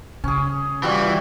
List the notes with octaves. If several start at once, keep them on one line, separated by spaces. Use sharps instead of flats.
C#3 C#4 G#4
E3 G3 F4 F#4